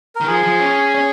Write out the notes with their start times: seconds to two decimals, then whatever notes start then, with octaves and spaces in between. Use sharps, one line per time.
0.15 A#4
0.21 D#3
0.26 F3 G#4
0.43 F3
0.60 C#4
0.95 C#4